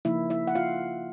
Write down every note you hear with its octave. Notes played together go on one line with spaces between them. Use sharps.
C#3 F3 A#3 D#4 E4 E5
E4 E5
F#5
F4 F5